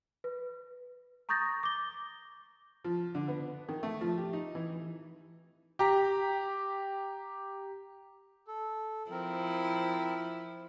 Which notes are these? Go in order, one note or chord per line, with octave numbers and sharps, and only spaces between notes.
B4
A#5 C#6 D#6 G6 A6 A#6
D6 G7
F3
D3
B3
D#3
A3
F3
G4
D#4
E3
G4 A#5
A4
F3 C4 E4 A#4